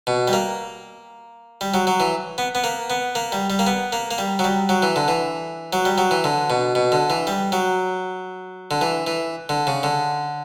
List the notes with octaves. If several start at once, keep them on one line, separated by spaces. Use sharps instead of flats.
B2
G3
A#3
G3
F#3
F#3
E3
B3
B3
A#3
B3
A#3
G3
G3
A#3
B3
A#3
A#3
G3
F#3
G3
F#3
E3
D3
E3
F#3
G3
F#3
E3
D3
B2
B2
D3
E3
G3
F#3
D3
E3
E3
D3
C#3
D3